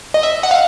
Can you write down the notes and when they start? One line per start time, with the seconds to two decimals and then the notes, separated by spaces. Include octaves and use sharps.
0.14 D#5
0.23 E5
0.43 F#5
0.51 F5